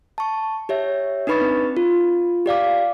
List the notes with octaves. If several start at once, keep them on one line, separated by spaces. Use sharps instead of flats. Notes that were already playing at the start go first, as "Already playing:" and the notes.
A5 C#6
G4 C#5 E5
D4 D#4 B4 B5 C#6 A6
C4
F4
G4 D5 F5 D6